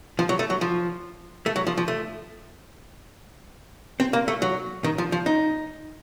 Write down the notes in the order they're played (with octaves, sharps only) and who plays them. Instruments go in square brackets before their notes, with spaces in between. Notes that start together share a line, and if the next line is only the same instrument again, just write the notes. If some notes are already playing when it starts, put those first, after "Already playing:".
[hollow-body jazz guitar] F3
F#3
A3
F#3
F3
A3
F#3
F3
F3
A3
C4
A#3
A3
F#3
D#3
F3
F3
D#4